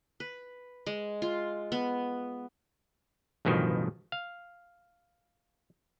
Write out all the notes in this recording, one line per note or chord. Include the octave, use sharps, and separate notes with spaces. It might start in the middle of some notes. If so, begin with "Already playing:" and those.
B4
G#3
F4
B3
A1 G2 B2 D#3 F3
F5